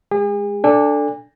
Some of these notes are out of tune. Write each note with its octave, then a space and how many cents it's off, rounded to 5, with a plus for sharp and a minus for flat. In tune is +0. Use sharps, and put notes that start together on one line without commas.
G#3 +0 G#4 -40
D4 +0 A4 +10 G#5 -40